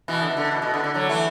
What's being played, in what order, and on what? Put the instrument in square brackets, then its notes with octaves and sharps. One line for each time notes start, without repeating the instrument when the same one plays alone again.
[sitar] B2 E3
D3
B2
D3
B2
B2
D3
D3
D3 F#3
E3 A3